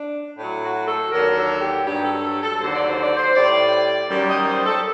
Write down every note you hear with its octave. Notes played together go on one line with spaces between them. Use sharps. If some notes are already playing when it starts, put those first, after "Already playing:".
Already playing: D4
A2 F#3
F#4
A4
D#2 D3 F#3 A#4
A4
G4
G2 F#3 G4
A4
A4
A4
D#2 D3 F#3 C5
D5
C5
D5
C5
A2 G3 D5
F#2 D#3 G3
D#5
C5
A4